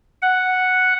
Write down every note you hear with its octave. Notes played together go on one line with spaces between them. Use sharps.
F#5